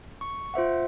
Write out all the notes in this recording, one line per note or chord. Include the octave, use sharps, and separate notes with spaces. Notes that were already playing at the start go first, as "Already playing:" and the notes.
C#6
F4 C5 E5 F#5